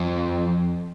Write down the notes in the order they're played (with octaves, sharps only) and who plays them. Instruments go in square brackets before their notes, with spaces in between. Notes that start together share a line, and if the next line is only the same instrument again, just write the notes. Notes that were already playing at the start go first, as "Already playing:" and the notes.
Already playing: [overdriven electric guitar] F2